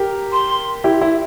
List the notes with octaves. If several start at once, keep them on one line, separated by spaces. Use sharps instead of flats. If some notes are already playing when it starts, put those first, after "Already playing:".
Already playing: G4 A#4
C6
E4 G4
E4